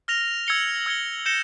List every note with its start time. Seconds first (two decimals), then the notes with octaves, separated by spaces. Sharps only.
0.08 F6 A#6 F7
0.47 E6 G#6 C#7 G7
0.86 E6 G#6 C#7 G7
1.26 G6 A#6 C#7 E7 G7